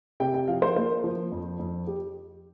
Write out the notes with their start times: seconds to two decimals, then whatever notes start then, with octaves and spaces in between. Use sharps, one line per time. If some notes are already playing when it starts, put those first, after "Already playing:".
0.20 C3 G5
0.34 G5
0.48 F3 F5
0.62 C5
0.76 A#3 C5
1.04 F3
1.32 F2
1.59 F2
1.87 G4